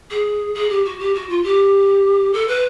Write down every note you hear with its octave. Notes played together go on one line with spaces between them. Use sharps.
G#4
G#4
G4
F#4
G4
F#4
F4
G4
A4
B4